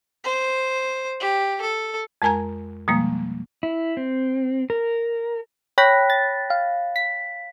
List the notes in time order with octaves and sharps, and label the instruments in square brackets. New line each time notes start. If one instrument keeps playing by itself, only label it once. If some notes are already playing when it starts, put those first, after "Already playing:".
[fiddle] C5
G4
A4
[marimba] F2 G#3 A#4 G#5 A#5 G#6
B2 F3 G3 G#3 A#3
[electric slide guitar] E4
C4
A#4
[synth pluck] C#5 G5 B5 F#6 A#6 B6
A6
F5
B6